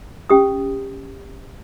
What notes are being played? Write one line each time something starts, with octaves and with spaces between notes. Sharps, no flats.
C#4 G4 D#6